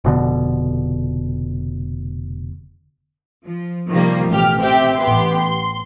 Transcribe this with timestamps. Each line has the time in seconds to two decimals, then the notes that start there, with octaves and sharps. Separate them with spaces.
0.04 F1 B2 D3
3.45 F3
3.89 C3 D#3 F3 G3 A#3
4.29 A1 B2 G4 F6
4.61 C4 G4 E5 G5
5.00 A1 B3 G4 C6
5.35 C6